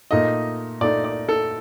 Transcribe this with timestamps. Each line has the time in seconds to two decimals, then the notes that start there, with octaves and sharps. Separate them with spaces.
0.11 A#2 A3 D#4 D#5
0.81 A#2 A3 D#4 D5
1.04 D5
1.29 A4